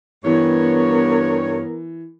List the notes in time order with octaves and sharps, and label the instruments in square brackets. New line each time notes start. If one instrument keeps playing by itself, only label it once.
[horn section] G2 C#5 [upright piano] E3 [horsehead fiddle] B3 A#4